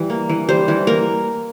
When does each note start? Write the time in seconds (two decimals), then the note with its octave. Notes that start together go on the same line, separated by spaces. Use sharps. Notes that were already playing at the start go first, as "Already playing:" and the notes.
Already playing: E3 G3
0.10 A#3
0.29 E3
0.49 G3 C5
0.68 E3
0.87 A#3 A#4